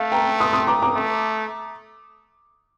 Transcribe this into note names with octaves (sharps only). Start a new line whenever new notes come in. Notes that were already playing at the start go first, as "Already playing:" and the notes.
Already playing: A3 F5
G5 A#5
C6 D#6
C6 D#6
A#5 D6
A#5 D6
A3